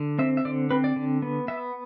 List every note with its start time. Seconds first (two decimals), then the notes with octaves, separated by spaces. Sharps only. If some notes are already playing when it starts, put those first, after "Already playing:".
Already playing: D3
0.19 C4 E5
0.37 E5
0.45 D3 D5
0.71 C4 B4
0.84 D5
0.96 D3
1.22 B3
1.48 B3 E5